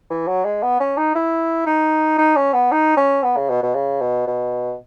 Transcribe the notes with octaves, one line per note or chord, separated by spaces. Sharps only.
E3
F#3
G#3
B3
C#4
D#4
E4
D#4
D#4
C#4
B3
D#4
C#4
B3
C#3
B2
B2
C#3
B2
B2